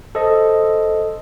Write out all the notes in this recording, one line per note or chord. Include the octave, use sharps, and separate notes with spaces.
A4 C5 D#5